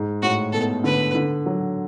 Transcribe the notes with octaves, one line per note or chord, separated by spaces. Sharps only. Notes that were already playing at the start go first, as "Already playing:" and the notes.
Already playing: G#2
A2 F#4
B2 A4
D3 B4
D3
F#3